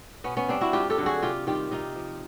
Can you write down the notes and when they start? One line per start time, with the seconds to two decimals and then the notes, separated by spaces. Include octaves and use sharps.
0.24 B2 B3 C#4
0.37 B3 C#4
0.48 G3 C4 D4
0.61 E4 F#4
0.73 G2 F4 G4
0.90 G4 A4
0.98 D3 F#3
1.06 F#4 G#4
1.22 C3 F4 G4
1.47 D#3 G3 F4 G4
1.71 C3 D#4 F4
1.96 F3